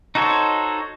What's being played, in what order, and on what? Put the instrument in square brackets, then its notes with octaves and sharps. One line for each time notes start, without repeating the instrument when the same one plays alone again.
[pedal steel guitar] D#4 F#4 A4 C5 C#5